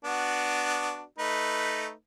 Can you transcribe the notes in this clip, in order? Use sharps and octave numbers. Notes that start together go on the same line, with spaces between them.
B3 D4 F#4
A3 D#4 B4